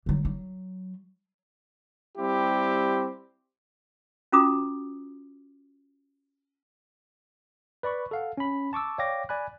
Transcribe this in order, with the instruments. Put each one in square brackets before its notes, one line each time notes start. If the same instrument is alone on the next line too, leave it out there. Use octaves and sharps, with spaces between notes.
[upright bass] D3 F#3
F#3
[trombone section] G3 C4 E4 G4
[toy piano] C#4 F4 F#4 A#5 D6 D#6
[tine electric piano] B4 D5 B5 C#6
A4 F5 F#5
C#4 B5
A5 C#6 D6 E6
C#5 D5 F5 G5 D6 A#6
D5 G#5 B5 F#6